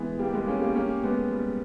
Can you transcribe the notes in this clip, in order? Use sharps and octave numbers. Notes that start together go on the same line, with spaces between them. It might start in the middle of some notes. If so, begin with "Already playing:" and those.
Already playing: E3 G#3 B3
G3 A#3 G4
G#3 B3
A#3 C#4
G3 A#3
A#3 C#4
G#3 B3
G3